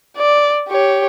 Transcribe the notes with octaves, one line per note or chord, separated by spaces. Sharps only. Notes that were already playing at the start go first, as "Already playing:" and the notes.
D5
G4 C#5